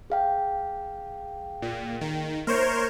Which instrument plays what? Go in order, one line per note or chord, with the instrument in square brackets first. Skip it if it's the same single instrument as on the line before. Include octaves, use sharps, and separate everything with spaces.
[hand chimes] G#4 F5 G5
[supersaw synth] A#2
D#3
[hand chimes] A#3 [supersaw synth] A#4 C5 C#5